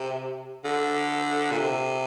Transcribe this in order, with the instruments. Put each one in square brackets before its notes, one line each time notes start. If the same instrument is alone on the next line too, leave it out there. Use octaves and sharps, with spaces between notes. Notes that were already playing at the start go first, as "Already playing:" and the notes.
Already playing: [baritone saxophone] C3
D3
A#2
C3